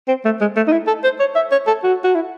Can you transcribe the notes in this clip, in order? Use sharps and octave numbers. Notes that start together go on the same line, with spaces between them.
C4
A3
G#3
A3
D#4
E4
A4
C5
C#5
E5
C#5
A4
F#4
F#4
E4